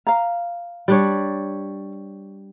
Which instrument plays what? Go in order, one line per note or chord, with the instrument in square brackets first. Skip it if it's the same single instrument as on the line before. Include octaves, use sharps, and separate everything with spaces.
[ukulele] F5 A#5
[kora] G3 D4 C#5